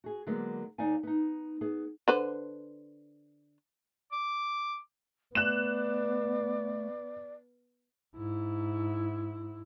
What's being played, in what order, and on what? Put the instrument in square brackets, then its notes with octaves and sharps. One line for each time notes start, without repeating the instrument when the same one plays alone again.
[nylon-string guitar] F#4 G#4
D3 F#3 G#3 A#3 B3
D#2 D#4 D5 F5 G#5
B3 D#4
B3 G#4
[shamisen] D3 B4 C5
[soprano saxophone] D6
[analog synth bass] A3 [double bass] B3 [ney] D5 [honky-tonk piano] F#6 E7
[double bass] G#2 E4